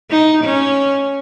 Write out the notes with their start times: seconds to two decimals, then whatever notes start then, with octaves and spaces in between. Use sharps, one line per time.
0.10 D#4
0.44 C#4